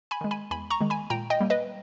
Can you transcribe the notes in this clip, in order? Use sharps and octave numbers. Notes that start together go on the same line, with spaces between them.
G#5 B5
D#3 G#3
G#5 B5
E2 G#5 B5
A#5 C#6
D#3 G#3
G#5 B5
A#2 G5 A#5
D#5 G5
G3 A#3
B4 D#5